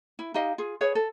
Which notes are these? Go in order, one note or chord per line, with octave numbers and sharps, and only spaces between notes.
E4
D#4 G4 D#5 F5
F4 G#4
G#4 B4 C#5
A4